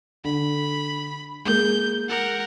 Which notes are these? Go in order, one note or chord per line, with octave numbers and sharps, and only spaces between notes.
D3 B5
G#3 A#3 G#4 G6
A#4 F#5